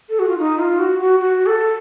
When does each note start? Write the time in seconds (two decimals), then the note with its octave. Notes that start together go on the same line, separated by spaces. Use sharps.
0.10 A4
0.19 F#4
0.29 F4
0.39 D#4
0.59 F4
0.79 F#4
0.99 F#4
1.20 F#4
1.46 A4